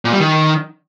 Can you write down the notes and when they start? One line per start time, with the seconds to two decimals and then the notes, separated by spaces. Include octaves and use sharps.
0.05 A#2
0.12 G3
0.20 D#3